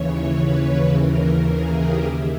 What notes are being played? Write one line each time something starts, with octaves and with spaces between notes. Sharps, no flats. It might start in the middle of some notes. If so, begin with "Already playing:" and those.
Already playing: D#2 C#3 E3 C#5
B4
D#2 C#3 E3 A#4
G#4
G4
D#2 D#3 E4